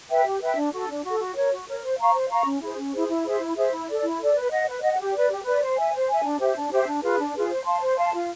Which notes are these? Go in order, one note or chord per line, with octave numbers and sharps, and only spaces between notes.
B4 E5 G5
G4
B4 E5 G5
D4
F#4 A4
D4
F#4 A4
F#4
A#4 C#5
F#4
A#4 C#5
C5
F5 A#5 C#6
C5
F5 A#5 C#6
C#4
E4 G#4 C5
C#4
E4 G#4 C5
E4
G#4 C5 E5
E4
G#4 C5 E5
E4
A4 D5
E4
A4 D5
B4
D#5 F#5
B4
D#5 F#5
G4
B4 D5
G4
B4 D5
C5
E5 G#5
C5
E5 G#5
D4
G4 C5 E5
D4
G4 C5 E5
D4
F4 G#4 B4
D4
F4 G#4 B4
C5
F5 A5 C6
C5
F5 A5 C6
F4